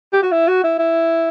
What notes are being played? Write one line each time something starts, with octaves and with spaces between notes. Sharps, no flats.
G4
F#4
E4
F#4
E4
E4